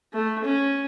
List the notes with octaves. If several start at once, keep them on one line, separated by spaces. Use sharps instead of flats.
A3
C#4